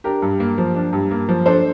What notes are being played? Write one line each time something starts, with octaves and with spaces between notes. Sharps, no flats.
D4 G4 A#4
G2
A#3
F3
D4
G2
A#3
F3
D4 A4 C5